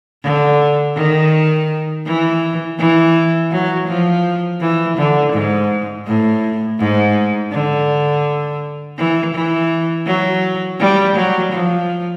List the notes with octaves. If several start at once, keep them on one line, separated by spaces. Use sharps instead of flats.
D3
D#3
E3
E3
F#3
F3
E3
D3
G#2
A2
G#2
D3
E3
E3
F#3
G3
F#3
F3